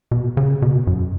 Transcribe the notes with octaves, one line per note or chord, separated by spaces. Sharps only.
B2
C#3
B2
F#2